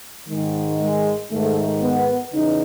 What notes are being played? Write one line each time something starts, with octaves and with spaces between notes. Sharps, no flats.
G#2 D#3 G#3
G#3
G#2 D#3 A3
B3
E2 C#3 E3 D#4